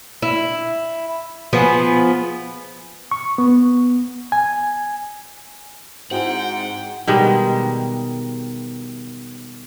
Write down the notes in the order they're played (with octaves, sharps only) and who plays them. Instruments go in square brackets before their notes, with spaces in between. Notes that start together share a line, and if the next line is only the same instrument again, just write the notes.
[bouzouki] E4
F3 B3 G#4
[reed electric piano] C#6
B3
G#5
[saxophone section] G#2 [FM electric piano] C4 E4 F#4 [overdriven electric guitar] F#5 [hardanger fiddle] G5
[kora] B2 D#3 G3 G#3